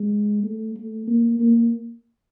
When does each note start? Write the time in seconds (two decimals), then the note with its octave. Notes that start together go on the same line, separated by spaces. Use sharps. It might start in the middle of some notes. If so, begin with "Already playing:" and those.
Already playing: G#3
0.43 A3
0.75 A3
1.07 A#3
1.39 A#3